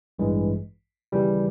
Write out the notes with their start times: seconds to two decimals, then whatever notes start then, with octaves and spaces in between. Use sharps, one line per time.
0.19 A1 G2 E3 G#3
1.12 D#2 C#3 E3 G3